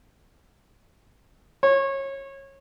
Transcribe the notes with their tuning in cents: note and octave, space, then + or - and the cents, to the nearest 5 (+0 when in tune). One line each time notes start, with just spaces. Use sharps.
C#5 -25